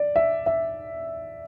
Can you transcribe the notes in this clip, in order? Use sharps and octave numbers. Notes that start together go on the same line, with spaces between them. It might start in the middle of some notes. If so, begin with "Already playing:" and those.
Already playing: D5
E5
E5